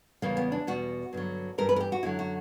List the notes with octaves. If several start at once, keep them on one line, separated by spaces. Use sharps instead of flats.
E2 C#3 E3 G3 A#3
B3
D4
E2 B2 G3 F#4
G2 D3 F#3
G2 E3 G3 A#4
B4
A#4
G4
F#4
F#2 D3 F#3 E4
F#4